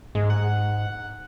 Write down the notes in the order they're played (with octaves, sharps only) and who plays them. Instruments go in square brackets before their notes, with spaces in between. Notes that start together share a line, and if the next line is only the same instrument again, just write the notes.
[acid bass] G#2 [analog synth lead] G#3
[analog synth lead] F#5